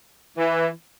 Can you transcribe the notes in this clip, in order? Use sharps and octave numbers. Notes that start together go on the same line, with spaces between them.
E3